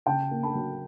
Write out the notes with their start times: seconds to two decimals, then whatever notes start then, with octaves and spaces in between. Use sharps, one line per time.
0.06 C#3 G5 A5
0.31 A#3
0.43 A5 B5
0.55 F#3